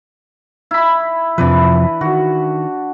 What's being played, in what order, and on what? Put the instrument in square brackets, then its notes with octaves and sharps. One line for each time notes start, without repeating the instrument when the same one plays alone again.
[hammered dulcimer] E4 B5
[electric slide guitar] F2 C3 F3 [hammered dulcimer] E3 D4 B4
[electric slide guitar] D#3 [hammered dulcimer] F#4